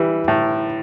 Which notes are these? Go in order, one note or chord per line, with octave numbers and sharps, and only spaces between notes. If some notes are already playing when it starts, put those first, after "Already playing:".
Already playing: E3 G3
A2